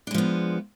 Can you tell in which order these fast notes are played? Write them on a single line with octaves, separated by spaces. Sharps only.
D4 G#3 F3 B3